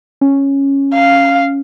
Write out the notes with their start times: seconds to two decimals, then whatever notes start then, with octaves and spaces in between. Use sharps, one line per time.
0.21 C#4
0.94 F5